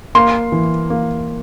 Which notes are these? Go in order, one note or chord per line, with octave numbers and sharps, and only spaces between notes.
A#3 C6
E3
A#3